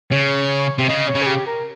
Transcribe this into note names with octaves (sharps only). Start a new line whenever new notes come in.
C#3 C#5
C3
C#3 D#5
C#5
C#3
G#4
G4
A#4